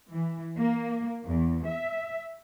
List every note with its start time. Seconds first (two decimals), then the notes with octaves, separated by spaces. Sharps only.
0.12 E3
0.57 A#3
1.25 E2
1.67 E5